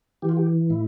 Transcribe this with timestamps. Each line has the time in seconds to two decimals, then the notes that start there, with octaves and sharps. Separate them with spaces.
0.22 E3 G4
0.29 F4
0.37 G4
0.70 A2 E4